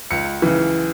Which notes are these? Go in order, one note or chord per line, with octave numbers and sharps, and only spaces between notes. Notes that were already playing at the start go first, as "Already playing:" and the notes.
C#2 C#7
C#3 E3